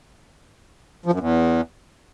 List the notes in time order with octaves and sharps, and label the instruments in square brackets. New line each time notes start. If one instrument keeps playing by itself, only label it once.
[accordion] F3
F#2
E2